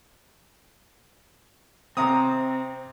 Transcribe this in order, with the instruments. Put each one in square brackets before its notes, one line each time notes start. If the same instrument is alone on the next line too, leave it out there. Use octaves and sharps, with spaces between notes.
[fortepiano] C3 A#5 D#6 [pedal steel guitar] C4